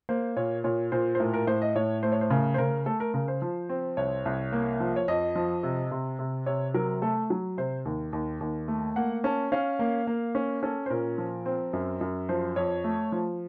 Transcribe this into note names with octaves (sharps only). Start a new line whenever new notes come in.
A#3 C5
A#2 C#5
A#2 C#5
A#2 C5
C5
A2 A#4
A#4
A2 C5
D#5
A2 C#5
A3 C5
C#5
C5
C#3 A#4
C5
C#3 A#4
A3 A4
A#4
C#3 A#4
C5
F3
C4
C2 C#5
C2
A#3
F3
C#5
F2 D#5
F3
C3
C3
C3
C3 C#5
F#3 A#4
A3 A4
F#3
C3 C5
D#2
D#2
D#2
A3
A#3 F#5
C#4 A5
C#4 F5
A#3
A#3
C#4
C#4 A4
C5
A#2 A#4
F3
C4
F#2
F#2
F3 C5
F2 C#5
A3
F3